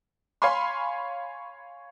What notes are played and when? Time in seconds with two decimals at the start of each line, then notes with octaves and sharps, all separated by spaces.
0.42 C#5 F5 G#5 B5 C6